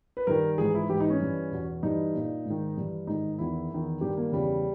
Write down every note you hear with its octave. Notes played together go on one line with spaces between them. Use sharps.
B4
G2 D#3 A#4
G#2 E3 G#4
E4
G#2 E3 G4
D#4
C#4
G2 E3
E2 B2
G2 E3 D#4
A#2
G#2 D#3
G2 E3
G#2 D#3 D#4
E2 D#3 E4
E2 D#3
G2 D#3 G4
A#3
E2 C#3 E3 G3